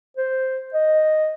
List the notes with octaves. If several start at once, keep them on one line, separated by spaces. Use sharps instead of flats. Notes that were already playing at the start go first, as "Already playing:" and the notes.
C5
D#5